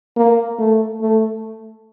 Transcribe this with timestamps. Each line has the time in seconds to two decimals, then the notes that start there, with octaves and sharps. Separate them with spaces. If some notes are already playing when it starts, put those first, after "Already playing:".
0.17 A#3
0.59 A3
1.02 A3